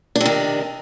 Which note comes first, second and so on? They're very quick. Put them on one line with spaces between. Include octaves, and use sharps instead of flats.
D4 C3 D#3